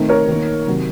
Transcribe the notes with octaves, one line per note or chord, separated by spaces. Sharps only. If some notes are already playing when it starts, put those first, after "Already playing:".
Already playing: D#3 A3 C4 D#4
A#4 C#5
D#3 A#3 D#4
C3 D#3 F#3